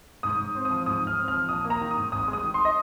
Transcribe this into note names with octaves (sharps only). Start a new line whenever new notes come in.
G#2 D#6
G#2
C4
D#6
F3
G#2 D#6
G#2
F6
C4
F3 F6
A#1 D#6
A#3
A#5
D#3
D#6
G#2
G#1 D#6
G#3
D#6
D#3
C6
D#5